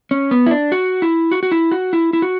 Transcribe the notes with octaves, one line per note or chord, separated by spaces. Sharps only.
C#4
B3
E4
D4
F#4
E4
F#4
F#4
E4
F#4
E4
E4
F#4